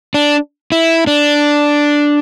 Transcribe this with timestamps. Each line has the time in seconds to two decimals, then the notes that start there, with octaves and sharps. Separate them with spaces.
0.14 D4
0.72 E4
1.07 D4